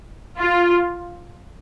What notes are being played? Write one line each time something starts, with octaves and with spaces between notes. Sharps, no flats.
F4